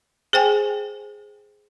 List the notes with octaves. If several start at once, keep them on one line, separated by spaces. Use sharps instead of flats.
G#4 C5 G5 G#5